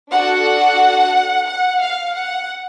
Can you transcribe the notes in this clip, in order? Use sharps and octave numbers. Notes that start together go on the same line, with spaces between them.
D4 F#4 A4 F#5
F#5
F5
F#5